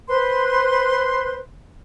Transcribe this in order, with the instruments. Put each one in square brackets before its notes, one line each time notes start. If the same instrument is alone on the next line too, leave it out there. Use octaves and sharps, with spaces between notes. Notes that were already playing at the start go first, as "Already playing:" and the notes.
[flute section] B4 C5 C6